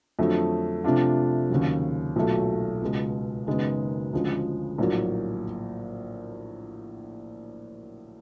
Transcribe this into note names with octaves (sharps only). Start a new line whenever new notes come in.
F2 D3 F#3 A3
C3 F3 A3 D4 F4
D#2 C#3 F#3
B1 A#2 F#3 A3
C#2 B2 G#3
F#1 F#2 D#3 G#3 B3
D2 C#3 F3 G#3
A#1 A2 F#3 A#3